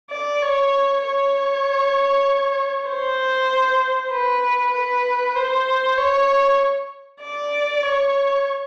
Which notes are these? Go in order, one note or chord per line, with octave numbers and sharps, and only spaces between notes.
D5
C#5
C#5
C5
B4
B4
C5
C#5
D5
C#5